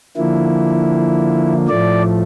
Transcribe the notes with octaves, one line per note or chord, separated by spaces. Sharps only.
D3 F3 A#3 E4
A2 F3 A3 D5